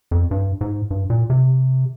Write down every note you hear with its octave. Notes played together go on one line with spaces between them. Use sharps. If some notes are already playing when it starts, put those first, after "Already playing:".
F2
G2
G#2
G2
A#2
C3